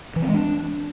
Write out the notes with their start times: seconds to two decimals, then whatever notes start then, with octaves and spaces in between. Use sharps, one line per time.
0.16 E3
0.22 C4
0.28 G#3
0.34 D4